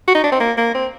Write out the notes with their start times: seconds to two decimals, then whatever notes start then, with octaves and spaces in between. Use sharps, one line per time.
0.08 F#4
0.15 D#4
0.24 D4
0.32 C4
0.40 A#3
0.58 A#3
0.74 C4